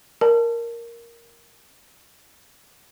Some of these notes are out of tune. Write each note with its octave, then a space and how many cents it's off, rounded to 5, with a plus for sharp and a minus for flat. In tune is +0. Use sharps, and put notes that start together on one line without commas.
A#4 +0 D5 +0 A5 +0